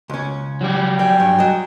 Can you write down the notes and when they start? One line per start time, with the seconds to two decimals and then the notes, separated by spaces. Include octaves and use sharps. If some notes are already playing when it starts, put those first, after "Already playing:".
0.10 C#2 C#4
0.61 F#3 G3 G4
0.99 D5 G5 G#5
1.20 G2
1.39 F#3 D#5